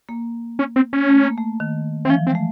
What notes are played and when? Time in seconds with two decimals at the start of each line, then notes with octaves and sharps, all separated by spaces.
0.09 A#3
0.59 C#4
0.76 C4
0.93 C#4
1.09 A3
1.24 A#3
1.37 A3
1.60 D#3
2.05 E3 C4
2.10 F3 C#4
2.27 G#3 C4
2.35 A3